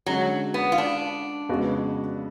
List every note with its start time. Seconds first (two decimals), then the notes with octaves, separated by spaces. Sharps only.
0.06 D3 F#3 G#3 C#4 F#4
0.54 B3
0.72 F4
0.78 D4
1.49 F2 C#3 G#3 B3 F#4